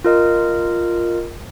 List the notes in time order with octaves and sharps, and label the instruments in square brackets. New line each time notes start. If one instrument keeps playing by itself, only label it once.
[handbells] F4 A#4 D#5